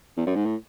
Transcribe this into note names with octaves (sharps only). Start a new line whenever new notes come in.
E2
F#2
G#2
A2